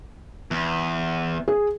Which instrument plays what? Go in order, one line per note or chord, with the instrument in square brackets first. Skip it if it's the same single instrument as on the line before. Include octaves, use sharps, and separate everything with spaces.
[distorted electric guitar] E2
[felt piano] G#4